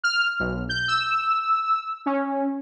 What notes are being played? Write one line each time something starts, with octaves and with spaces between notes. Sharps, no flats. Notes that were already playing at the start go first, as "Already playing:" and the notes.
F6
B1
G6
E6
C#4